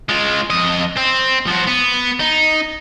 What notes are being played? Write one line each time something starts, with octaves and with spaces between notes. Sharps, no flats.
G#3 F4
F2 D#5
C4
F3 F#4
B3
D#4